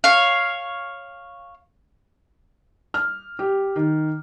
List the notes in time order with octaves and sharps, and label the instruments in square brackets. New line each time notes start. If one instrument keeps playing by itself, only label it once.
[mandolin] C#5 F5
[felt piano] F6
G4
D#3